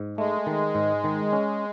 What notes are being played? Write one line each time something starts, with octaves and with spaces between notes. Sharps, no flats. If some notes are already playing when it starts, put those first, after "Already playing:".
Already playing: G#2
G#3 A3
D#3
G#2
D#3
C#4